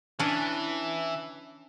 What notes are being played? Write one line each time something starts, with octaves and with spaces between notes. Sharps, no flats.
E3 C#4 D4